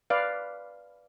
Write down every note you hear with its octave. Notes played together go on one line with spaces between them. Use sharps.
B4 D5 F5